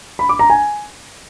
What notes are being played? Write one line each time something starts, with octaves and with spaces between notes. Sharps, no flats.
B5
D6
A#5
G#5